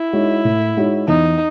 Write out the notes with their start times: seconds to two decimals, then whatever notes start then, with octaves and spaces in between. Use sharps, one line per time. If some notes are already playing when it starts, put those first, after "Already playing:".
Already playing: E4
0.13 G#3 D#4 F#4 C#5
0.45 A2
0.77 G#3 D#4 F#4 C#5
1.08 E2 D#4